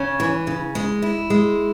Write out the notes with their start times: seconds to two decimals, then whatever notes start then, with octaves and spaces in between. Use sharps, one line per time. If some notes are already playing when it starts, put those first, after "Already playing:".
Already playing: C#3 C#4
0.20 E3
0.47 C#3
0.75 G#3
1.02 E4
1.30 G#3